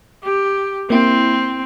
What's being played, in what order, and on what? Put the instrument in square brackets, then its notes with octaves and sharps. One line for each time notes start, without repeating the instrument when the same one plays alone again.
[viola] G4
[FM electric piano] A#3 E4 [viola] C4